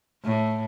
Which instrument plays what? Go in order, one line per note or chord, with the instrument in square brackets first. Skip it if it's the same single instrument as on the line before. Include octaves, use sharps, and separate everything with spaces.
[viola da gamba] A2